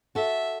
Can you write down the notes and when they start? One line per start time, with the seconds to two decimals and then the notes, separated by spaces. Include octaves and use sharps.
0.15 F#4 A4 E5